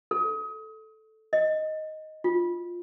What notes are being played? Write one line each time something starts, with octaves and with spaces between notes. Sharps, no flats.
A4
D#5
F4